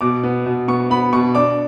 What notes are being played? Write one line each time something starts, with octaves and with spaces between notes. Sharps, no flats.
B2 D6
B3
B2
B3 C#6
B3 B5
B2 C#6
D4 D6